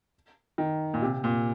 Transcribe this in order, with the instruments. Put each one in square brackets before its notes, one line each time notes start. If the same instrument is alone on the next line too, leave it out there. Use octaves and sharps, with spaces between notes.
[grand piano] D#3
A#2
C3
A#2